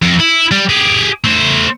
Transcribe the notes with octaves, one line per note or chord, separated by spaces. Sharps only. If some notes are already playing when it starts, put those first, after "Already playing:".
F2
E4
G3
G4 G#4
A3 C5